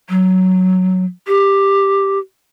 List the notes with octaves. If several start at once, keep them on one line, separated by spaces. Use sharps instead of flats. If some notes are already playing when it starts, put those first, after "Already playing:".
F#3
G4